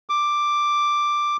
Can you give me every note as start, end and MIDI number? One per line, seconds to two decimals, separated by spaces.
0.09 1.37 86